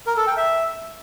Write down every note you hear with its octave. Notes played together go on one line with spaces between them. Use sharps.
A#4
A4
G5
E5